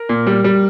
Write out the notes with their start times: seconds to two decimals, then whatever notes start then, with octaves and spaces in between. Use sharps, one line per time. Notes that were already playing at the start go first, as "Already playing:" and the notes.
Already playing: A#4
0.09 A#2
0.27 G3
0.44 G3